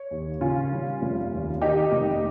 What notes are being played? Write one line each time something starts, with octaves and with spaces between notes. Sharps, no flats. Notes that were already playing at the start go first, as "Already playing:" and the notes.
Already playing: C#5
D#2
C#3 C#4 F4
G3
F1
D#2
D#3 D#4 G4
F1